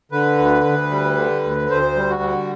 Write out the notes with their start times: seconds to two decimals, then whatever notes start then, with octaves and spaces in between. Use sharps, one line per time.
0.12 D3 B4
0.38 D2
0.64 D2
0.91 G3
1.17 D3
1.44 D2
1.70 D2 C5
1.96 G3
2.10 F#4
2.22 D3